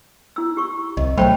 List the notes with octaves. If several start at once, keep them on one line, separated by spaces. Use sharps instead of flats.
E4 E6
G4 C#6
C2 D#5
B1 F#3 A3 C5 G5 B5